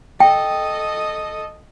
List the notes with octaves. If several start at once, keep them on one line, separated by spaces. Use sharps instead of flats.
A4 D#5 G5